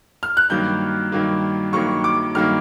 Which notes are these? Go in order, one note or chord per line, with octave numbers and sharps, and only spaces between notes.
F6
F#6
G2 D#3 F#3 A#3 G6
G2 D#3 F#3 A#3
G2 D#3 F#3 A#3 C#6
D6
G2 D#3 F#3 A#3 F6